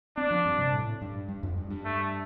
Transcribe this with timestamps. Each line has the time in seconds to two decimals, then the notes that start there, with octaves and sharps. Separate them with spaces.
0.17 C4 D4
0.31 F3
0.46 G2
0.58 C3
0.73 A2
1.02 G2
1.29 G2
1.43 F2
1.57 G2
1.70 G2
1.85 A3